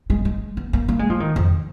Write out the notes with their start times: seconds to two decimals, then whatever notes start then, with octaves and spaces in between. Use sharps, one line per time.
0.10 G#3
0.25 G#3
0.57 B3
0.73 A#3
0.89 A#3
0.99 G#3
1.10 F3
1.20 D#3
1.36 F2